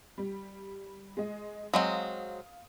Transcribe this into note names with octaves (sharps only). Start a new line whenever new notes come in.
G3
G#3 D#5
F#3 G#3 C4 F5 D#6